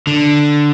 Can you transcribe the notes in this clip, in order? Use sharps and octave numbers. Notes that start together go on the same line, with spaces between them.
D3